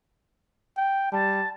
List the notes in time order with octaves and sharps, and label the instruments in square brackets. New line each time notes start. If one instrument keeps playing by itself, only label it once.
[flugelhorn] G5
[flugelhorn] G3 [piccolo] A5